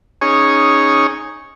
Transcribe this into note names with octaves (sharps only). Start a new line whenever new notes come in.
C#4 D#4 G#4 C#5